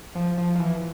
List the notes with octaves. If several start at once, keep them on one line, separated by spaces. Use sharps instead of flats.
F3
F3
F3
E3